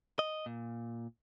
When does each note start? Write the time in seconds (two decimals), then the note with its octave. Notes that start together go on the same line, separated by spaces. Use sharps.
0.19 D#5
0.46 A#2